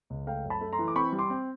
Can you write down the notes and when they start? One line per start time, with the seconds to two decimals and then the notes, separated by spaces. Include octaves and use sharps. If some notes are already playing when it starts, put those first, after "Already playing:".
0.10 C#2
0.27 A3 F5 G5
0.44 F#2
0.50 A5 B5
0.61 A3
0.73 A#5 C6
0.79 E3
0.88 D6
0.95 C4 B5 C#6
1.12 G3
1.19 C6 D6
1.30 C4